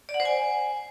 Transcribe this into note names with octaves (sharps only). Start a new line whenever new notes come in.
D5
F#5
C5
G#5